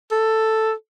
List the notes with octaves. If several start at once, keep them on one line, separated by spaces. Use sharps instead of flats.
A4